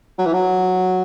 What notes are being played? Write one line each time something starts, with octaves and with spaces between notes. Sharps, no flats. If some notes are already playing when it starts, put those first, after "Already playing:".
F#3
E3
F#3